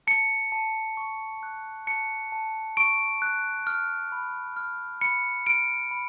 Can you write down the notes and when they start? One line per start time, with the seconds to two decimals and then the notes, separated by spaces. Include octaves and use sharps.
0.07 A5 C#7
0.52 A5
0.97 C#6
1.43 F#6
1.87 A5 C#7
2.32 A5
2.77 C#6 D7
3.22 F#6
3.67 F6
4.12 B5
4.57 F6
5.01 B5 C#7
5.47 F6 D7
5.91 B5